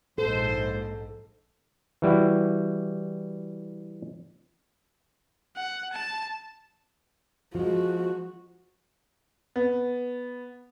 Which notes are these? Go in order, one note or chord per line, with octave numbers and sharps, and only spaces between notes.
A#1 G#2 A4 C5
E3 G3 E4 F#4
F#5
A5
F3 G#3 F#4
B3